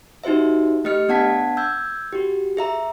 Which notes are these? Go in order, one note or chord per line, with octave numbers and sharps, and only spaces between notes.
D#4 F#4 G4 C5 E5
A3 G4 D#5 F6 C#7
B3 D4 F#5 A5 G#6 B6
E6 G6 G#6
F#4 G4
G#4 E5 A#5